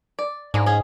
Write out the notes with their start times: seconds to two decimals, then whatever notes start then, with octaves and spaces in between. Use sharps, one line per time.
0.19 D5
0.54 G#2 G#3 A#3 D4
0.66 C#4 G#4